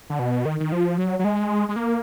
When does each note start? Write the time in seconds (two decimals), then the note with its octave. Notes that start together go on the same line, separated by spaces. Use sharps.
0.10 D3
0.19 B2
0.45 D#3
0.60 D#3
0.72 F3
0.98 F#3
1.19 F#3
1.24 G#3
1.69 G#3
1.76 A#3